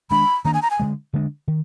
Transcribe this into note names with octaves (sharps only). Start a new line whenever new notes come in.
D#3 G#3 D4 B5
D#3 A#3 D4 A#5
G#5
A#5
G#5
D3 F3 G#3
D3 G#3 D4
D#3